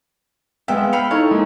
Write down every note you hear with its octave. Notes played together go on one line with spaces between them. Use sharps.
G#3 B3 E5 F5 G5
F5 G5 B5 C#7
D#4 E4 A4 C#5
G#3 A#3 D#4